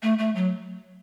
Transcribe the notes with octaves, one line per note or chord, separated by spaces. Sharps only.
A3
A3
F#3